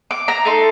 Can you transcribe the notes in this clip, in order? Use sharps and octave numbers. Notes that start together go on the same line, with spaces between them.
D6
A#5
A3 D#4 A4 C6